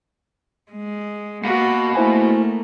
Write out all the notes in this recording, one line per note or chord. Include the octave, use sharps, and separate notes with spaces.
G#3
B2 A#3 F#4
A3 E4 C5 G#5